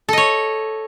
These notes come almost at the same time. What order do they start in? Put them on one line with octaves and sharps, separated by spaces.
A4 D#5 C#5